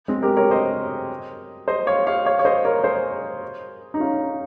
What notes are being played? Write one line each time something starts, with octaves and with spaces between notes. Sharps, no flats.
G#3 C4
G4 A#4
A#4 C#5
C5 D#5
C5 D#5
C#5 F5
C#5 F5
C#5 F5
C#5
C5 D#5
A#4 C#5
G#4 C5
D#4
C#4 F4